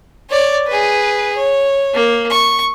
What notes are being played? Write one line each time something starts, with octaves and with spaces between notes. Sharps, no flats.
C#5 D5
G#4 B4
C#5
A#3
C#6